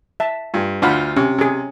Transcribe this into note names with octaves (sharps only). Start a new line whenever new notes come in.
E5 A5
G2 F4
D2 D4 F4 F#5 B5
C3 C#4
C3 C#4 G#4